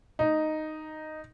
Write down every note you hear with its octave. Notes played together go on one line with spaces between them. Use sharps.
D#4